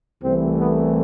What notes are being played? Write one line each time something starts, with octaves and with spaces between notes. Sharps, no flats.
C2 C3 E3 A3 C4
B3